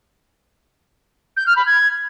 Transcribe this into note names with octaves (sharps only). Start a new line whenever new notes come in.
G6
F6
B5
G#6